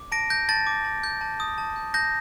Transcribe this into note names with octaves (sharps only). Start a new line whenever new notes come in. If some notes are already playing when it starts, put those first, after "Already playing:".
Already playing: D6
A5 A#6 D7
G6 A#6
A5 A6
D6
A5
G6
A5
D#6
A5
G6
A5 G6 A#6